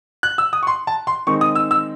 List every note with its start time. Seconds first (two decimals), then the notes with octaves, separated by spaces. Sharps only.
0.23 F#6
0.38 E6
0.53 D#6
0.63 C#6
0.67 C6
0.87 A5
1.07 C6
1.27 D#3 G#3 C4 D#4 C#6
1.41 D#6
1.55 E6
1.71 E6